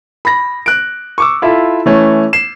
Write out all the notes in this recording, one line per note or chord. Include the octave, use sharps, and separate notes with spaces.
B5 A#6
F#6 D7
C#6 D6 E6
E4 F4 A4 E5
E3 A3 C#4
C7 E7